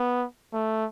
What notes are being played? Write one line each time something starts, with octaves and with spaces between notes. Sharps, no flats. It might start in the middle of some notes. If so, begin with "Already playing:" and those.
Already playing: B3
A3